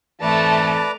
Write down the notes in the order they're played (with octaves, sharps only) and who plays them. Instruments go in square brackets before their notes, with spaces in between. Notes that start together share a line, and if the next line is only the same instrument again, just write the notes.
[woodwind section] F2 G#2 E3 [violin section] A3 [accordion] B4 D5 A#5 [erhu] A5